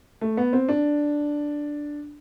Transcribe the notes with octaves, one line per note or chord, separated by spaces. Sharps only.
A3
B3
C4
D4